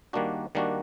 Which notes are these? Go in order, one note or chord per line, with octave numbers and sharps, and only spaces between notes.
D#3 G3 A#3 D4 F#4
D#3 G3 A#3 D4 F#4